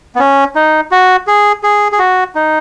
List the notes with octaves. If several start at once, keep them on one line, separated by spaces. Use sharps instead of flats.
B3
C#4
D#4
F#4
G#4
G#4
G#4
F#4
D#4